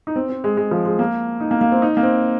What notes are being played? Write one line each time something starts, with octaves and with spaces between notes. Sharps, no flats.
D#4
C4
C4
G#3
G#3
F3
G#3
A#3
D#4
A#3
A#3
C4
D#4
A#3
C4